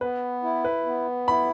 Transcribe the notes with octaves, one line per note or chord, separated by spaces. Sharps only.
B3 B4
E4
B4
B3
E4 B5